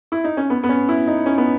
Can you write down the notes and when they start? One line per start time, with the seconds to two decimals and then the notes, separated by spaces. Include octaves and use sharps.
0.12 E4
0.24 D#4
0.37 C#4
0.50 B3
0.63 B3
0.69 C#4
0.88 E4
1.07 D#4
1.26 C#4
1.38 B3